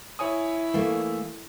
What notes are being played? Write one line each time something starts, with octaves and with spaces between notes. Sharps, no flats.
E4 C#5 G#5 D#6
E3 A3 A#3